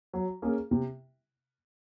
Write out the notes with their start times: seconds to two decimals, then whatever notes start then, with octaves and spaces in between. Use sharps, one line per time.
0.13 F#3
0.42 A#3 C#4 G#4
0.71 C3